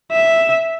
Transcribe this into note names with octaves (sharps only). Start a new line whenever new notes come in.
E5